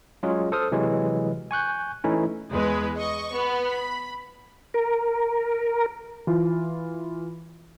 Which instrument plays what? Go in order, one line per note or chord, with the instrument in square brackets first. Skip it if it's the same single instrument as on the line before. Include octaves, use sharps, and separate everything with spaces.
[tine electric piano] F#3 G#3 C#4 F4 G#4
A4 C5 D#6 F6
C3 E3 F#3 G#3
G#5 C#6 F#6 G6
E3 A3 C#4 D#4 E4
[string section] E2 G#3 B4
D#5 C#6
B3
B5
[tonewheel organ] A#4
[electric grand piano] E3 F4